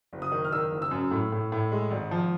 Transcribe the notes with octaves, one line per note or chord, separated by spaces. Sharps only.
F#1
D#6
D#3
F6
D#3 E6
F#1
E6
F#2
A2
A2
A2
G#3
G#1
F3